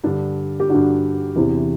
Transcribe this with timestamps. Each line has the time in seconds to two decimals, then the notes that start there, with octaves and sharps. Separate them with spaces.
0.04 G2 D3 D4
0.60 G4
0.69 G2 D3 D4 F#4
1.36 E2 C3 E3